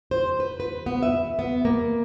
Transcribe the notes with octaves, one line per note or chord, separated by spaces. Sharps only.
C5
B4
B4
B3
E5
B3
A#3